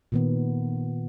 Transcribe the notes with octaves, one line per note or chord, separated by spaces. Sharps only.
A#2 D#3 B3